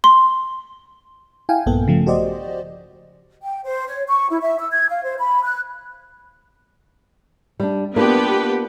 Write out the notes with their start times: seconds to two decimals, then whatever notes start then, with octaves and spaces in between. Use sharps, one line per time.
0.04 C6
1.49 E4 F5 G5 G#5
1.66 A#1 G2 A#3 B3 A4 G5
1.88 C#3 F3 A3
2.07 F#4 G4 C5 D5 D#5
3.43 G5
3.64 C5
3.88 C#5
4.08 C#6
4.29 E4
4.41 E5
4.59 E6
4.72 G#6
4.88 F5
5.04 C5
5.19 B5
5.43 F#6
7.60 G3 D4
7.96 A#3 B3 D4 F4 G4 B4